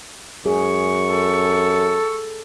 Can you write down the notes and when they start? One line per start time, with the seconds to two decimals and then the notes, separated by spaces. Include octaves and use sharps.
0.46 F#2 G#4 C#6
1.11 A4